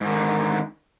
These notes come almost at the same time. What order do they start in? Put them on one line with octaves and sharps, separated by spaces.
G#2 D#3 D3